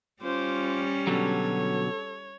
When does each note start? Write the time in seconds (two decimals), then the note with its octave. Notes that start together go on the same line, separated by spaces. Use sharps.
0.22 G3 C#4 F4 C5 D6
1.07 B2 D3 F#3 A4 C#5